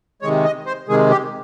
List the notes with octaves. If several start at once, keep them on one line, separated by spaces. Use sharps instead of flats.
C3 D#3 G#3 C#5
D#5
C5
C3 D#3 G#3 G#4
G4